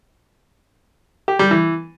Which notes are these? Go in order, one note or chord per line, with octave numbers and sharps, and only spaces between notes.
G4
G3
E3